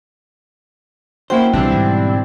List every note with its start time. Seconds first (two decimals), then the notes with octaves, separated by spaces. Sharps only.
1.30 A#3 C#4 E4 F#4 C5 G5
1.53 B1 C#3 E3 G3 B3 C4 D4 E4
1.71 G#2 B2 D3